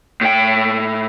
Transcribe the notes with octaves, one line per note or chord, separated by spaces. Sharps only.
A2 G5